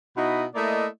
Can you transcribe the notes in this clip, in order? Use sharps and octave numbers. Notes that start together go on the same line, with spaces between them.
B2 D#4 E4 F#4 D#5 B5
A3 A#3 E4 D5 D#5